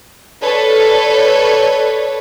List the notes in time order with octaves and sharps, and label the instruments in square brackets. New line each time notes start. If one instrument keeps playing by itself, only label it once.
[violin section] A4 B4 C#5 D5